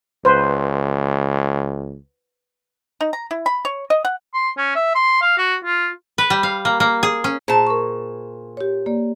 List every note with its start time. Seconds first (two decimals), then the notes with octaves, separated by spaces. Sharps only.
0.25 C#2 B4 C5
3.01 D#4
3.13 A#5
3.31 E4
3.46 B5
3.65 C#5
3.90 D#5
4.05 F#5
4.34 C6
4.57 C#4
4.75 E5
4.95 C6
5.21 F5
5.38 F#4
5.64 F4
6.18 B4
6.30 G3
6.43 F5
6.65 A#3
6.80 A#3
7.03 G#4
7.24 C#4
7.48 A#2 G#4 C5 A5 A#5
7.67 A#4 C#6
8.57 G4 C#5
8.86 A#3 D5